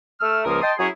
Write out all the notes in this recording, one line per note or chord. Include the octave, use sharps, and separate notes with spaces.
A3 E6 F6
C#2 F3 A#3 A#4 D#6
D#5 G5 A5 C6 D#6
F#3 C#4 E4 G#4